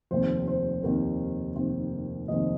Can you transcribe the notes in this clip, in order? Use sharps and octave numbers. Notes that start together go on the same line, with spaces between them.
F1 D#2 D#3 C4 C5
C5
F1 D#2 D#3 C4 A#4
F1 D#2 D#3 C4 C5
F1 D#2 D#3 C4 D#5